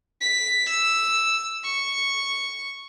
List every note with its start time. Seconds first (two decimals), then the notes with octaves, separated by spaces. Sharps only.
0.21 B6
0.70 E6
1.64 C#6